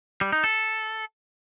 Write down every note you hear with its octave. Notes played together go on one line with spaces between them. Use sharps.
G3
D#4
A4